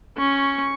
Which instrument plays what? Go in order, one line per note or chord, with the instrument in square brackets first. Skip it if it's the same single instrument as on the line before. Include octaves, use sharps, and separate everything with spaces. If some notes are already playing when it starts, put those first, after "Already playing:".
[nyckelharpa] C#4 [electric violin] C#6